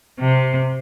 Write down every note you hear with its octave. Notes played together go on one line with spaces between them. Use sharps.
C3